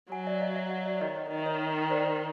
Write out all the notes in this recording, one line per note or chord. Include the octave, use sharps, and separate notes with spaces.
F#3 F#5 G#5
D5 E5
D#5 F5
E5 F#5
E5 F#5
D5 E5
D#3 C#5 D#5
C#5 D#5
D#3 D#5
E5
C#5 D#5
C5 D5